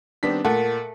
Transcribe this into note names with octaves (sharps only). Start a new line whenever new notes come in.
D#3 G3 B3 C4 D4 B6
A#2 A3 A#4 F#5